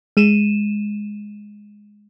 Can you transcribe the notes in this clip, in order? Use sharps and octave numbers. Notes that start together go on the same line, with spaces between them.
G#3 D#7 E7